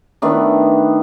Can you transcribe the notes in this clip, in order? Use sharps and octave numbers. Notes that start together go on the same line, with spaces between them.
D#3 A3 B3 D4